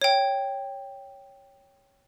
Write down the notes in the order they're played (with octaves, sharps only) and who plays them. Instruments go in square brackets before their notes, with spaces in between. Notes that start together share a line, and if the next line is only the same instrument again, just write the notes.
[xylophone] C#5 G5